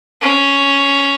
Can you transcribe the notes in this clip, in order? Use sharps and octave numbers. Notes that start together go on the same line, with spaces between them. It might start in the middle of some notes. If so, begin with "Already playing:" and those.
C#4